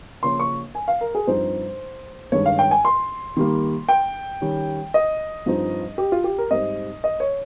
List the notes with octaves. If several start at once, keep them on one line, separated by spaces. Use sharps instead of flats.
C#3 F3 A#3 C#4 C6
C#6
G#5
F5
A#4
G#4
G2 F3 C4 D#4 C5
G2 D#3 G#3 C#4 C#5
F5
G5
G#5
C6
D#3 G3 A#3
G5
D#3 G3 C#4
D#5
G2 F3 C4 D#4
G4
F4
G4
A#4
G#2 G3 C4 D#5
D#5
C#5